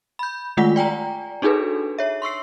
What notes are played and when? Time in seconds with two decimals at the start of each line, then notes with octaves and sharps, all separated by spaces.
0.19 B5 G6
0.57 D#3 G#3 A3 F4 F#5 B6
0.76 D5 G5 G#5 A#5
1.42 D4 D#4 F#4 G#4 A4 B4
1.98 C#5 E5
2.22 C6 C#6 E6 C7